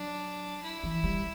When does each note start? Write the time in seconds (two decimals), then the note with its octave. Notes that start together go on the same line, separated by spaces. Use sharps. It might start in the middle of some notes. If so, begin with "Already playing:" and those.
Already playing: F#3 D4
0.63 E4
0.83 E3
1.04 G3